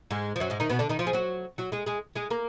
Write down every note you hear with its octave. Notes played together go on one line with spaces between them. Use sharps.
G#2 G#3
F3
F#2 F#3
G#2 G#3
D#3 D#4
B2 B3
D3 D4
D#3 D#4
F3 F4
G#4
F#3 F#4
F#3 F#4
G#3 G#4
G#3 G#4
G#3 G#4
A#3 A#4